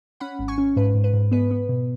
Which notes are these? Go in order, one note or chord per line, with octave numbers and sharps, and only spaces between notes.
C#4 F#5 B5
G#1
G#5 C#6
C#4
G#2 B4
G#2
B4
G#2
B3 B4
B3
B2